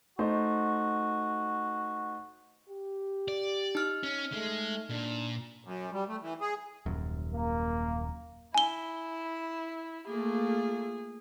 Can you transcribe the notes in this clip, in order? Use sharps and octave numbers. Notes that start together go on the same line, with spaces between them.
A3 D#4 F#4 C5
G4
D5
D#4 F6
C#4
G#3 A3
A#2 D4
F#2
G3
A3
E3
G#4
D#1 F#2
A#3
E4 G#5 G7
A3 A#3 F4 G#4